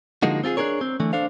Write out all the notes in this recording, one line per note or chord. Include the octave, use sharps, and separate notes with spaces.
D3 F3 G#3 A#3 D#4 F#4
C4 F4 G4 G#4
D4 E4 G#4 A#4 C#5
C4
D3 E3 A3
D4 A4 C5 F5